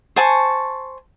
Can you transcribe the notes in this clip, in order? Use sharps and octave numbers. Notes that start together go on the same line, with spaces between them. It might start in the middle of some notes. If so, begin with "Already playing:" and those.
C5 G#5 A5 C#6